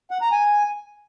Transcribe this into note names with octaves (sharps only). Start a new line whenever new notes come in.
F#5
A#5
G#5